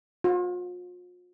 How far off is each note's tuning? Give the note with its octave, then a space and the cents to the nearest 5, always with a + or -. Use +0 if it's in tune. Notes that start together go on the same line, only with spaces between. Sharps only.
F4 +40